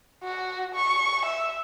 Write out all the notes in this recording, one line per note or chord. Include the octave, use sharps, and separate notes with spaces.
F#4
C#6
E5